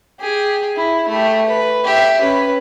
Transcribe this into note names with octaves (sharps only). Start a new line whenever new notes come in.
G4 G#4
E4
A3 G4
B4
G4 E5
C#4 B4